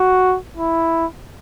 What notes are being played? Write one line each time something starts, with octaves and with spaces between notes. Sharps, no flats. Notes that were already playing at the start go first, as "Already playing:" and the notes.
Already playing: F#4
E4